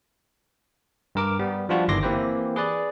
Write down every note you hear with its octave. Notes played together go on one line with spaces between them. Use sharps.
G2 A#4 D6
G3 B3
F3 G3 D4 F4 F#4
G1 D#3 E3 C6 D6 A#6
E3 A#3 C4 G4 B4 C5
G#4 B4 D5